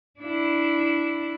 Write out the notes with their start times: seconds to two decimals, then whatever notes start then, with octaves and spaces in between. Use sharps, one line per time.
0.20 D4 E4